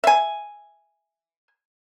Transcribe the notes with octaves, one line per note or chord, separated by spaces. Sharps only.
E5 G#5